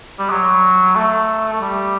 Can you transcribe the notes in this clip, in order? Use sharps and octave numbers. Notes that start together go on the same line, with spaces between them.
G3
F#3
A3
A3
G3